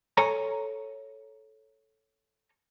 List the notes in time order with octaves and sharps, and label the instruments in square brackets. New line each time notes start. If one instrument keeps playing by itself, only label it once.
[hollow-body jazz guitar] A4 C#5 G#5 A#5